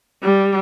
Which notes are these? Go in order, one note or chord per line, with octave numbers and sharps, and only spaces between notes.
G3